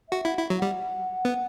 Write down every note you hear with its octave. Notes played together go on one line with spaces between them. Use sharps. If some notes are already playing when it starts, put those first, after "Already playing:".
F#4 E5
E4 F#5
E4
F#3
G3 F#5
B3